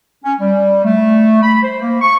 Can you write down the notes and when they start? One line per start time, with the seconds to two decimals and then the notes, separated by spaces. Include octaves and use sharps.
0.24 C#4
0.40 G3
0.85 A3
1.43 B5
1.63 C5
1.81 A#3
2.02 C#6